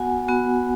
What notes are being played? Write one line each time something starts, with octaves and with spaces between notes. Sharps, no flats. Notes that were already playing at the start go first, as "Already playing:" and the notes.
Already playing: B3 F#4 F#5 G#5
B3 F#4